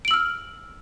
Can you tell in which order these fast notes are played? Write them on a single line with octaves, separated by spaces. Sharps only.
D7 F#7 E6 F6